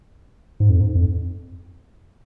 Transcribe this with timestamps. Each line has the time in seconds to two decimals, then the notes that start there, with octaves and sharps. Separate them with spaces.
0.60 G#2
0.70 F2
0.80 G#2
0.95 F2